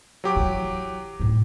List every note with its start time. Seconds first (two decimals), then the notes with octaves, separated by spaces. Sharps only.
0.24 F#3 G4 D6
0.36 E3 E4
1.20 A2 D#4